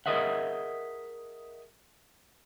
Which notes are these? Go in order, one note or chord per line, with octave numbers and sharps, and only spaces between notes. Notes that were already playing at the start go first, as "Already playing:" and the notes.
G#4 A#4 D#5 E5 F#5